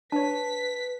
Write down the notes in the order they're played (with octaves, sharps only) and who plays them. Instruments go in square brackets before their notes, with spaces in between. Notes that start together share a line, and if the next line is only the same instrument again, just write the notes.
[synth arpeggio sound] D4 C#5 [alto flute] B4 [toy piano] A5 [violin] B6